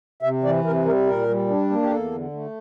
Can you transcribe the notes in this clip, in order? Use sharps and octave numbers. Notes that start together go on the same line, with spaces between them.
C3 E5
E3 D5
C3 A#4
G3 A#4
A#2 A#4
G3
D4
A#3
G4
E2 A4
D3
A3